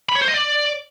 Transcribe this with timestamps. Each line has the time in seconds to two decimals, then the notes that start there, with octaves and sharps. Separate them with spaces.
0.09 B5
0.15 C#5
0.21 C5
0.28 D#5
0.34 D5